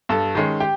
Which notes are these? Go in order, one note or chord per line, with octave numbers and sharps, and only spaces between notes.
G2 A4 A5
D#3 G#3 C#4
G4 G5